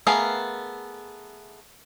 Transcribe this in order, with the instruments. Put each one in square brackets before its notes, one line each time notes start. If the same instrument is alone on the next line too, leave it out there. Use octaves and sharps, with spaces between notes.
[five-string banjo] A3 B3 G#4 A#4 F5